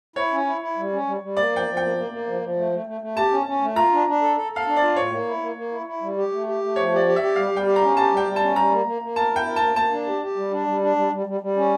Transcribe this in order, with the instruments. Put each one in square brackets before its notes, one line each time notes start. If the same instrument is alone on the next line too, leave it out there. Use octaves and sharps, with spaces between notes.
[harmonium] E4 [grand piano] C#5
[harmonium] C#4
E4
E4
G3
C#4
G3
G3
[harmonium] A#3 [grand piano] D5
[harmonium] F3 [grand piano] G5
[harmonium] F3
[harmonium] A#3 [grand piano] G5
[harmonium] A#3
A#3
F3
F3
A3
A3
A3
A3
[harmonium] G4 [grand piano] A5
[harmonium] C#4
C#4
A3
[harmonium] F4 [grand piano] A#5
[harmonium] D4
D4
A4
A4
[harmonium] A4 [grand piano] F5
[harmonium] D4
[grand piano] D5
[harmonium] F4
[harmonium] A2 [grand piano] C#5
[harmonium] A#3
E4
A#3
A#3
E4
E4
G3
G4
A3
G4
A3
[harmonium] F3 [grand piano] C#5
[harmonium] G4 [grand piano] D5
[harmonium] G4
[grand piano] E5
[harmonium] G4
[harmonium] G3 [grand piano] F5
[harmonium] G3 [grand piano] G5
[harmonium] G4
[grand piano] A#5
[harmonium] C#4
[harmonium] G4 [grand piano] A5
[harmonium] G3
[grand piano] G5
[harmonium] G3
[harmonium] C#4 [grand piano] A5
[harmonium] G3 [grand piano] A#5
[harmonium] A#3
A#3
A#3
[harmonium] A#4 [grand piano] A5
[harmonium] E4
[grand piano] G5
[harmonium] A#4
[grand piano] A5
[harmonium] A#3
[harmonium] A#3 [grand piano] A5
[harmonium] D4
G4
G4
G3
D4
G3
D4
G3
G3
G3
G3
C#4